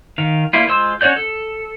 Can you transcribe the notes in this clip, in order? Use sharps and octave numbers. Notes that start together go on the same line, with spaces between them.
D#3 F5
G3 A#3 E4 F4
G#3 F4 C5 C6 E6
C#4 F#4 C#5 D5 G6
A4